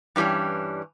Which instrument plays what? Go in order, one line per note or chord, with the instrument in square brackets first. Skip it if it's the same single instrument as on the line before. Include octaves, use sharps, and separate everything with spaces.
[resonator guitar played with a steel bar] G2 E3 G3 C#4 D4